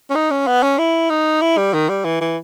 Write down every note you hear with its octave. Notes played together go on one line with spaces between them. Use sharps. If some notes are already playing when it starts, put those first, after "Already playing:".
C#4
D#4
C#4
B3
C#4
E4
D#4
E4
G3
D#3
G3
E3
E3